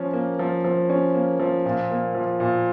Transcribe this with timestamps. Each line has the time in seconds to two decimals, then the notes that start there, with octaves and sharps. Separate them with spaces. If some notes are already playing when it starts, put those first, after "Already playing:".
Already playing: F3 C#4
0.13 A#3
0.39 F3
0.64 F3
0.89 C#4
1.14 A#3
1.40 F3
1.65 A#2
1.90 A#3
2.15 F3
2.40 A#2